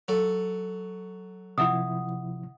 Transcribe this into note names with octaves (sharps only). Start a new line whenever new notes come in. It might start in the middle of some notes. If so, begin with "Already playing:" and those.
F#3 A4
C3 F3 E4 E5 F#5 D#6